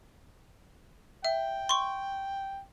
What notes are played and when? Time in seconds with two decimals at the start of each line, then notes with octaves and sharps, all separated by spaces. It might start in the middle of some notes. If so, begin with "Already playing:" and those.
1.24 E5 G5
1.69 C6 C#6